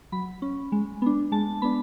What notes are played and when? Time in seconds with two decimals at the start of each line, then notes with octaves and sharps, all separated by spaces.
0.12 F#3 B5
0.42 C#4
0.72 G#3
1.02 B3 D4
1.32 G#3 A5
1.62 B3 D4 B5